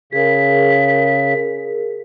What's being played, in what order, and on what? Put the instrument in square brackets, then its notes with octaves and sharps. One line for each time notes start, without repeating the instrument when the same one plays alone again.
[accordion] C#3 [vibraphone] G#4 A#4 [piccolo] B6